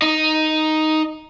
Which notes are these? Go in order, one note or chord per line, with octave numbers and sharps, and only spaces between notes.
D#4